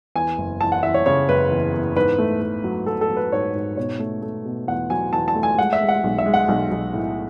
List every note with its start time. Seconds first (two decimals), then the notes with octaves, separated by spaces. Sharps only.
0.16 E2 G#5
0.38 F#1
0.61 E3 A5
0.72 F#5
0.83 E3 E5
0.94 C#5
1.06 C#3 C#5
1.29 F#1 B4
1.51 E2
1.74 E2
1.96 G#2 B4
2.19 A3
2.42 A3
2.64 F#3
2.86 F#3 A4
3.01 A4
3.10 F#3
3.17 B4
3.32 G#2 C#5
3.54 G#2
3.77 B2 C#5
4.00 A3
4.22 A3
4.45 B2
4.67 E2 F#5
4.90 F#3 G#5
5.13 E2 A5
5.28 A5
5.35 A3
5.43 G#5
5.58 G#3 F#5
5.73 E5
5.81 G#3
5.89 F#5
6.04 B1
6.18 E5
6.26 G#3
6.34 F#5
6.48 B1
6.71 B1
6.94 A2